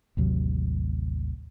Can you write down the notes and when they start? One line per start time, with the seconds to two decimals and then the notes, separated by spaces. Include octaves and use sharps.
0.17 A1 D#2 C3 F#3